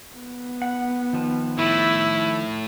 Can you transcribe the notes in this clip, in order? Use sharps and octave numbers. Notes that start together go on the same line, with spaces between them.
B3
F#5
D#3 F3
A2 E4